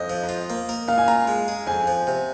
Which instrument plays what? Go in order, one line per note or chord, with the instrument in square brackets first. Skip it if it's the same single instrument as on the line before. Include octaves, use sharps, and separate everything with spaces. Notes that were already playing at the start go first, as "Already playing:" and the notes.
Already playing: [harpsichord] F2 [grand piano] D#5
[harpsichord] F3
F4
A#3
A#4
[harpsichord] A#2 [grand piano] F5
[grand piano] G#5
[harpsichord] F4 [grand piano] A#5
[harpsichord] G#3
G#4
[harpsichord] F2 [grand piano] G#5
[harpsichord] F3
C3